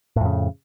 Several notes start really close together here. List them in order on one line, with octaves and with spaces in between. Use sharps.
A2 F2 C#3